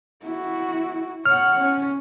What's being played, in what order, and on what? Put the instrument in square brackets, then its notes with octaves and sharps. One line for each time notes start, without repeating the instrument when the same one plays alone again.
[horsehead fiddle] E4 F#4
[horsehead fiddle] C#5 F#5 [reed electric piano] F6
[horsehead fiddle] C#4